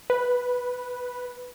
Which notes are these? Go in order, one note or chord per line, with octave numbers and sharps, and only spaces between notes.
B4